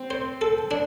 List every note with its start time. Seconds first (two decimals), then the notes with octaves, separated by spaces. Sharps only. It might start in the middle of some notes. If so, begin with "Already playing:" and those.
Already playing: C4
0.11 C5
0.41 A4
0.71 D4